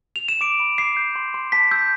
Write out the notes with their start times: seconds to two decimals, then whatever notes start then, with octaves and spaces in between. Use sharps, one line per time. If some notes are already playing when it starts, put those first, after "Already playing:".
0.16 F7
0.28 E7
0.41 D6 D7
0.60 B5
0.78 D6 C7
0.97 G6
1.16 C6
1.34 C6
1.52 A5 B6
1.71 E6 G6